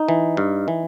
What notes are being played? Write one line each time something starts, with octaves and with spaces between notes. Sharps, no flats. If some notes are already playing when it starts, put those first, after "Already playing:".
Already playing: D#4
E3
G2
E3